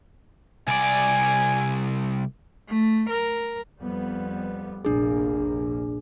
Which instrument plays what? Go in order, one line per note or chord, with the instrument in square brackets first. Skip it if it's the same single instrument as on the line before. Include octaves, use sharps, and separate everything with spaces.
[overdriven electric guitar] C2 D5 [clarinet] G#5
[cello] A3
A#4
[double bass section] F2 G3 B3
[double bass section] F1 A#1 A#3 [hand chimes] D4 G#4